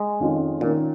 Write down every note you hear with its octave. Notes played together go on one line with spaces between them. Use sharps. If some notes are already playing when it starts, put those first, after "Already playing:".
Already playing: G#3
F2 D#3 C#4 F4
A#2 D#3 C#4 F4 A#4